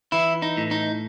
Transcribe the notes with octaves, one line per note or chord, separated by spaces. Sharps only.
E3 E4
D#4
A2
D#4